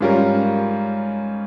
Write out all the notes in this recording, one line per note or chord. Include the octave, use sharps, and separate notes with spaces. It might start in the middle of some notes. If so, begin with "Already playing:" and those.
G#2 G3 C#4 F4 A#4